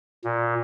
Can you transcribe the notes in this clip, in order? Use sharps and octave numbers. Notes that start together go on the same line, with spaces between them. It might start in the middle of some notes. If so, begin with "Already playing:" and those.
A#2